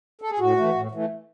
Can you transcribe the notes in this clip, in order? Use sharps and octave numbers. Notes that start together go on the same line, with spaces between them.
A4
G#4
A2 F#4
E3 A3
A2
E3 A3